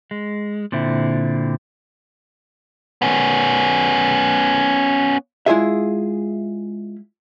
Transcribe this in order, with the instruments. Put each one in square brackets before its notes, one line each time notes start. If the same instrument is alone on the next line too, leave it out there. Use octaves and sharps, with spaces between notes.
[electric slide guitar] G#3
A#2 D3 C4 E4
[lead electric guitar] B3 C#4
[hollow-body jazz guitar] G#3 E4 F4 G#4 E5